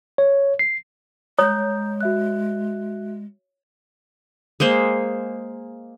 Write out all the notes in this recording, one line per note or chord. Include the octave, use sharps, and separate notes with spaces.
C#5
C7
G#3 C#5 A#5 D#6 G6
F#4 E5 F#6
G#3 A#3 C5